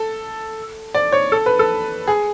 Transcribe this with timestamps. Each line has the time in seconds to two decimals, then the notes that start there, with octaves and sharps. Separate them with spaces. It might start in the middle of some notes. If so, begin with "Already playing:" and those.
Already playing: A4
0.94 D5
1.12 C#5
1.32 A4
1.46 B4
1.59 A4
2.07 G#4